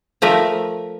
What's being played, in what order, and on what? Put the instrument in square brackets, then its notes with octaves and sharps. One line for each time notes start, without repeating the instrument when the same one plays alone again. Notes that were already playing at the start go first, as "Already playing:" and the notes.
[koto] F3 A3 A#4 E5